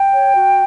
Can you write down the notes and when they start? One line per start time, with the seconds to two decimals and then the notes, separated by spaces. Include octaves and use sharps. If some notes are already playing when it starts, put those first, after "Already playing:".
Already playing: G5
0.13 C#5
0.34 F#4